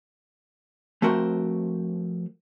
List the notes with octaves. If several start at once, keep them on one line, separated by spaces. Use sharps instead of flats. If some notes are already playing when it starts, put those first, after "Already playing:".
F3 A3 C4 F#4 A#4 C5